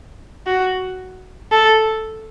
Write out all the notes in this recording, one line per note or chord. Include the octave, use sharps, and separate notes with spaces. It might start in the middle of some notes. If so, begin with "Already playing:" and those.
F#4
A4